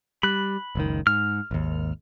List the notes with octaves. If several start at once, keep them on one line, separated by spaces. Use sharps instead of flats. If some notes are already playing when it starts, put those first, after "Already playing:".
G3 B5 F#6
F#1 C#2 D#3
G#2 F6
G#1 D#2